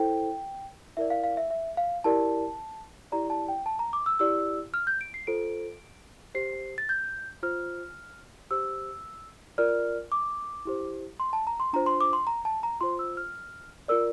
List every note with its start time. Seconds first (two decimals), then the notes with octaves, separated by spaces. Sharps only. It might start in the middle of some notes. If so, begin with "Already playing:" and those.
Already playing: E4 A4 C5 G5
0.97 E4 A#4 D5 E5
1.10 F5
1.24 F5
1.37 E5
1.51 E5
1.77 F5
2.04 E4 G4 A#4 D5 A5
3.12 E4 G4 D5 A#5
3.30 A5
3.48 G5
3.66 A5
3.79 A#5
3.93 D6
4.06 E6
4.19 E4 G4 D5 E6
4.74 F6
4.87 G6
5.01 D7
5.14 C7
5.27 F4 A4 C5 D7
6.35 G4 C5 C7
6.78 A6
6.89 G6
7.43 F4 C5 F6
8.51 G4 C5 E6
9.58 F4 A#4 D5 F6
10.12 D6
10.65 E4 G4 C5
11.20 C6
11.33 A5
11.47 A#5
11.60 C6
11.73 D4 F4 C5 A#5
11.86 C6
12.01 D6
12.13 C6
12.27 A#5
12.45 A5
12.63 A#5
12.81 F4 C5 C6
12.99 E6
13.17 F6
13.88 F4 A#4 D5 E6